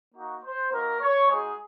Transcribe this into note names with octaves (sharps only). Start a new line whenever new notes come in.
A#3 D#4 F#4
C5
A#3 D#4 F#4 A#4
C#5
G#3 D#4 F#4 G#4